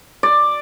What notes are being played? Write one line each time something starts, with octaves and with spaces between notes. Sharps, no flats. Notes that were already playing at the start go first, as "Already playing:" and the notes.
D5